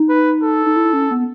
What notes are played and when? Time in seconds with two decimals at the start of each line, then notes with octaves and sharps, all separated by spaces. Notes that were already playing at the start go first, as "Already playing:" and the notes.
Already playing: D#4
0.09 B4
0.43 A4
0.66 D#4
0.76 E4
0.93 C#4
1.11 B3